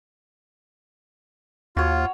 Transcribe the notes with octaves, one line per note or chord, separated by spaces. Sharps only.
D#2 F4 F#4 C#5